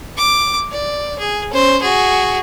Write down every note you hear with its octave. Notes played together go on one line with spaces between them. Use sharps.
D6
D5
G#4
C#4 C5
F#4 G#4